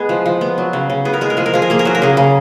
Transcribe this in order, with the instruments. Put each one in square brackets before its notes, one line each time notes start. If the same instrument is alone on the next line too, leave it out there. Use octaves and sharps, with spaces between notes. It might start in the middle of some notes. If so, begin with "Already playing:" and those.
Already playing: [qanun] G#3 B3 G#4
F3
F3
B3
F#3
C#3
C#3
B3 G#4
A#4
G#3 G#4
A#4
F3 G#4
A#4
F3 G#4
A#4
A#3 G#4
A#4
F#3 G#4
A#4
C#3 G#4
C#3